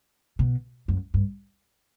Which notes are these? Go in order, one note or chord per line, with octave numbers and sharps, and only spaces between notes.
B2
F#2
G2